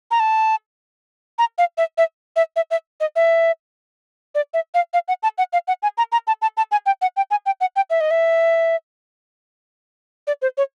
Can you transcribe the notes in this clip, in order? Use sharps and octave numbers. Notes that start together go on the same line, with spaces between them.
A#5
A5
A#5
F5
E5
E5
E5
E5
E5
D#5
E5
D5
E5
F5
F5
F#5
A5
F#5
F5
F#5
G#5
A#5
A#5
A5
A5
A5
G#5
G5
F#5
G5
G#5
G5
F#5
G5
E5
D#5
E5
D5
C5
C#5